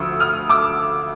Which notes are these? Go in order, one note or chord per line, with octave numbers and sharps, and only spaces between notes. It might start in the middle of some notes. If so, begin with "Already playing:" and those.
Already playing: D2 D3 F3 C#6 D#6 E6
D#6 F6
D6 E6